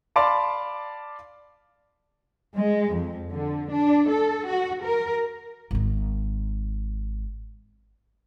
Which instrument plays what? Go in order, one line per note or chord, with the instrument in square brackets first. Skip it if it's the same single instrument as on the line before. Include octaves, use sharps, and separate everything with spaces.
[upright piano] D5 F5 A5 B5 C6 D6
[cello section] G#3
F2
D3
D4
A4
F#4
A#4
[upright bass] G#1 D#3